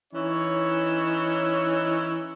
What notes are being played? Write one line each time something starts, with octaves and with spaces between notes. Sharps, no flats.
E3 C#4 D#4 C#5